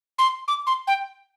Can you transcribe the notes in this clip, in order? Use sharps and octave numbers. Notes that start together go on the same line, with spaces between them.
C6
D6
C6
G5